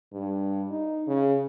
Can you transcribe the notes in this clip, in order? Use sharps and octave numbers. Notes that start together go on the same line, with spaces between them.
G2
D#4
C#3